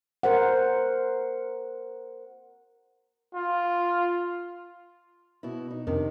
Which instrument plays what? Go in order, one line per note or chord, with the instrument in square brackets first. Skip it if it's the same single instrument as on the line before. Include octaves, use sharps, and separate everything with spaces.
[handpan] A#4 C5 F#5
[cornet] F4
[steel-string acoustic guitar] B2 E4
D#4
[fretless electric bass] F2 D4 [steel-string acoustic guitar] C3 D#3